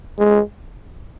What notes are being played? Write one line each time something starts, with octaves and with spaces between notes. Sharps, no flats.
G#3